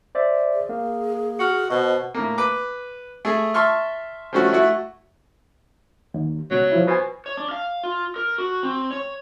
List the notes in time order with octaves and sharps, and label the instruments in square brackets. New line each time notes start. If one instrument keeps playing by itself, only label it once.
[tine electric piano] C5 D5 E5
[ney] G#4
[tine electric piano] A#3
[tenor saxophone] F#4 [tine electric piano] F6 C#7
[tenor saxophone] B2 [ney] C5 [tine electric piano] D#5 A5
[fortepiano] A2 A#3
B4 D6
A3 G#4
E5 A5 C6 C#6 F6
F3 G3 A3 C#4 F#4
A3 E4 F#4
[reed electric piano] D#2
[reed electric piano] C#2 B2 [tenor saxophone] F#3
[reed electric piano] F3 E4
[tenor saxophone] B2 [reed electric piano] B4 C5 G#5
[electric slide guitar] C#5
D4
F5
F4
A#4
F#4
C4
C#5